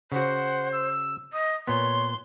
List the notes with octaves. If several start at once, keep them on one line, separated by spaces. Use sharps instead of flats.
C#3 F#4 C5 F#5
E6
D#5 D#6
A#2 B3 C#5 C6